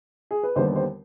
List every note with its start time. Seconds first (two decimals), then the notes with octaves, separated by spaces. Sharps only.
0.31 G#4
0.43 B4
0.56 D#2 D3 G3 B3 C5
0.76 C5